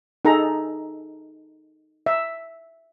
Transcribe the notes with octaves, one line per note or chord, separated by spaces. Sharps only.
D#4 G#4 A4 A#5
E5